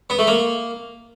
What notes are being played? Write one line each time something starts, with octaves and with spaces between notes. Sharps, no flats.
B3
A3
A#3